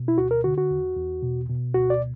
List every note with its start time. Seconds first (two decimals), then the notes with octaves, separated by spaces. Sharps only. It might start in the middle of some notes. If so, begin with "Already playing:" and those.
Already playing: B2
0.08 E4
0.18 D2 F#4
0.31 A#4
0.44 D3 F#4
0.58 F#4
0.71 E2
0.96 E2
1.23 B2
1.49 B2
1.75 D2 F#4
1.90 D5